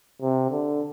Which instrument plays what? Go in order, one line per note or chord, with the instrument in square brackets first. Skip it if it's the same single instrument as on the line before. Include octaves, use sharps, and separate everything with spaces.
[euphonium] C3
D3